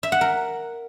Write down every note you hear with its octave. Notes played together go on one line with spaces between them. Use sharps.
E5
F#5
A#4